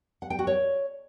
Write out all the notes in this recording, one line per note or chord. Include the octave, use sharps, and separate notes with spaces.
F#5
G5
F#4
C#5